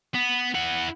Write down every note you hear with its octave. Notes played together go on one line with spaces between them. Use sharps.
B3
E4 F#5